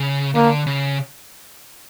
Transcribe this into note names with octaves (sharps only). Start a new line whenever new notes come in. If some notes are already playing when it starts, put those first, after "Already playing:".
Already playing: C#3
D3 A#3
C#3